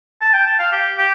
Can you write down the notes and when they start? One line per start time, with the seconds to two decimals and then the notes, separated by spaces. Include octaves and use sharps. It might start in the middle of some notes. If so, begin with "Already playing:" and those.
0.21 A5
0.33 G5
0.46 A5
0.59 F5
0.72 G4
0.98 G4